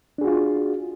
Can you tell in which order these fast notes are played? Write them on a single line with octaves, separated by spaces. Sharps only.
D4 G#4 F#4 F4